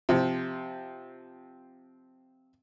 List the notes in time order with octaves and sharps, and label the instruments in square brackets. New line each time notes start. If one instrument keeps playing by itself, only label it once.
[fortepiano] C3 F3